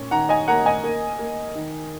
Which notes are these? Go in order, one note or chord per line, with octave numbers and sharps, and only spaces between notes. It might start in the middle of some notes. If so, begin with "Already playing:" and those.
Already playing: A#2 C#4
D#3 F#5 A#5
D#5 G#5
A#3 F#5 A#5
D#5 G#5
A#3
A#3
D#3